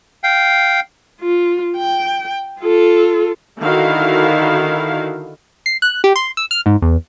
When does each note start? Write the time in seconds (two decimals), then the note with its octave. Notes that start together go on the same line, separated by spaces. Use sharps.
0.24 F5 G5
1.21 F4
1.77 G5
2.60 F4 A4
3.59 D3 D#3 E4 F#4 F5
5.66 C7
5.82 F#6
6.04 G4
6.16 C6
6.37 E6
6.51 F6
6.66 G#2
6.82 E2